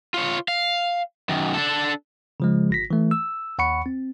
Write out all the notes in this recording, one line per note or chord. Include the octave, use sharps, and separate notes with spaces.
F4 C#5
F5
F#2 D#3
D4 A4
C#3 F3 G#3
G1 A#6 B6
E3 A3
E6
D#2 F#5 B5 C#6 C#7
C4